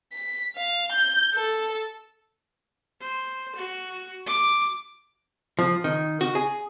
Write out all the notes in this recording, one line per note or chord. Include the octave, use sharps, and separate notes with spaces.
B6
F5
G6
A4
C5
F#4
D6
F3
D#3
F#4
G#4